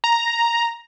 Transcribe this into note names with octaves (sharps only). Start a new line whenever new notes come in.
A#5